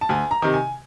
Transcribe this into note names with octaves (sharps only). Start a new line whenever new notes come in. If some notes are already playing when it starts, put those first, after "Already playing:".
A5
D2 G#5
A#5
C3 D#3
G#5